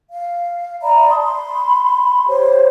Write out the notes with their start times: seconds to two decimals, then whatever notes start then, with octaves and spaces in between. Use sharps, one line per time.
0.11 F5
0.82 D5 E5 A#5 B5
1.08 A5 C6 D#6
1.21 B5 C6
2.28 G4 C5 C#5